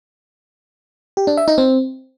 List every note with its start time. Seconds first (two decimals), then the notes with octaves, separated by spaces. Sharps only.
1.17 G4
1.27 D4
1.37 E5
1.48 D#4
1.58 C4